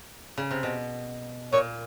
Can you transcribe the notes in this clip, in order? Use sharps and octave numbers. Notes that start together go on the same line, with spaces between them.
C#3
C3
B2
A#2 C#5